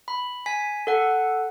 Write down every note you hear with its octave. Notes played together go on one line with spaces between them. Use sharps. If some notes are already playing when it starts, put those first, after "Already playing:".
B5
G#5 B6
A4 F#5